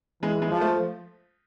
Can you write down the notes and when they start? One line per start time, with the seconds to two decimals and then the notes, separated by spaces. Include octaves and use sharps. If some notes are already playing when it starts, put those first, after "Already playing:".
0.22 E3 G#3
0.42 G#3
0.51 F3
0.61 A3